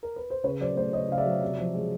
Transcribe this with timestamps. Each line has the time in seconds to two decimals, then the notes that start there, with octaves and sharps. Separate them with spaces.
0.03 A#4
0.16 B4
0.30 C5
0.44 C#3 B4 C#5
0.60 F#3 C5 D5
0.76 A3 C5 D5
0.93 C#3 C#5 D#5
1.09 C#3 F5
1.18 D5 E5
1.26 F#3
1.41 C3
1.59 F3
1.74 G#3